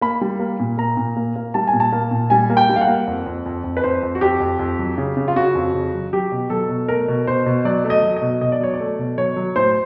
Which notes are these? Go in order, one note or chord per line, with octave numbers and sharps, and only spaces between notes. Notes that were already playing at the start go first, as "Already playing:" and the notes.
A#3 B5
G3
A#3
A#2
A#3 A#5
A#2
A#3
A#3
G3 A5
G#5
A#2
A5
A#3
A#2
G3 G#5
A#3
G5
G3
F5
F#5
A#3
F2
F2
F2
F2
B4
F2 C5
F2
F#4
F2 G4
F2
F2
F#3
C#3
C#3
F4
C#3 F#4
F2
C#3
F#3
F#3 G4
B2
F#3 A4
B2
A3 A#4
B2
B2 C5
B2
F#3 D5
A3
D#5
F#3
D#5
B2
B2 D#5
D5
F#3 C#5
D5
A3
B2
F#3 C#5
F#3
A2 C5